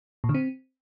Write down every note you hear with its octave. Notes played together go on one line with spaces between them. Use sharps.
A#2
D3
C4